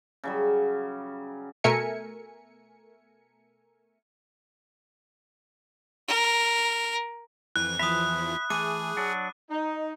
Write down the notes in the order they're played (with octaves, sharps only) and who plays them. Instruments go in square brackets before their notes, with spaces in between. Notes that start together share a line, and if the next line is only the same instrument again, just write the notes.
[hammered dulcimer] C#3 F#3 G3
[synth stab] B2 A3 A#4 E5 G#5 C#7
[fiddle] A#4
[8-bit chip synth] F2 E3 [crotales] F#6
[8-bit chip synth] E2 E3 F3 [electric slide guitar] E5 [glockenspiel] B5 D#6
[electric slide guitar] E3 A3 [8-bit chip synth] G#4 [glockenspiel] D6 D#7
[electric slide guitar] F#3 D4 F#5
[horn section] D#4